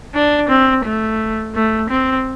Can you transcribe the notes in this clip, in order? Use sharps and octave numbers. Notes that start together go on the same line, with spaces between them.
D4
C4
A3
A3
C4